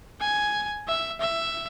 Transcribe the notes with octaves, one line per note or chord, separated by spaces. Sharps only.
G#5
E5
E5